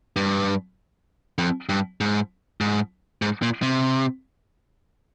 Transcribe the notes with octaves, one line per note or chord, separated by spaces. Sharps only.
G2
F2
G2
G#2
G#2
G#2
A#2
C3